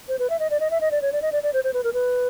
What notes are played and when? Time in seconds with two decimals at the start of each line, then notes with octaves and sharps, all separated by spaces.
0.08 C5
0.19 B4
0.30 E5
0.39 D#5
0.50 D5
0.60 D#5
0.71 E5
0.81 D#5
0.91 D5
1.02 C#5
1.13 D5
1.22 D#5
1.32 D5
1.43 D5
1.53 C5
1.64 C5
1.73 B4
1.84 A#4
1.93 B4